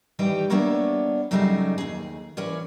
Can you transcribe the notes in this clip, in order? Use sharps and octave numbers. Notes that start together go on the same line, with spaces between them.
D#3 E3 G3 G4 B4 G5
G3 A#3 B3 D4 C#5 E5
F#2 C#3 F#3 G3 A3 D#4
D#2 G#4
E3 C#4 A#4 C#5 D5